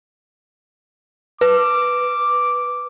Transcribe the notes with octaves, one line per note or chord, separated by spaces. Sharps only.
B4 D6